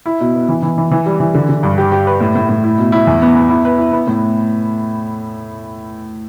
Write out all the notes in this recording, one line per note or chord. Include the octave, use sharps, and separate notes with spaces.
E4
B2
B3
E3
E3
E3
E3
G3
E3
D3
D3
G2
G4
G4
B4
A2
A2
A2
E4
B2
E4
E2
B3
B3
E4
B4
E4
B3
A2